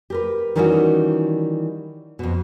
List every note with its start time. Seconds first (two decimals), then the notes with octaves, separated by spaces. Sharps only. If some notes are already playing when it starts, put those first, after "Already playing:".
0.10 G4 A#4 B4
0.56 D#3 E3 G3 C#4 D#4 F#4
2.19 F2 B2